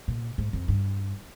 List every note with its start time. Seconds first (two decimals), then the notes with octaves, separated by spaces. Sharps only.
0.08 A#2
0.38 G#2
0.53 F2
0.68 G2